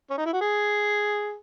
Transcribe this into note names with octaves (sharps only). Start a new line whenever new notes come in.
C#4
D#4
E4
F#4
G#4